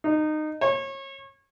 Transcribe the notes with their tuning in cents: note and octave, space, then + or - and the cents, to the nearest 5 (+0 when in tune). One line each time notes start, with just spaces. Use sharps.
D#4 -20
C#5 -30